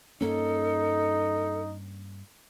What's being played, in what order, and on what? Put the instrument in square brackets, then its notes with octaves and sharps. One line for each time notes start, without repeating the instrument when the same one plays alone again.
[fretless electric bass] G2 A#3 C#4 [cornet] D#4 [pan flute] A4